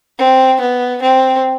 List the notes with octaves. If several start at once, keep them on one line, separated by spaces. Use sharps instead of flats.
C4
B3
C4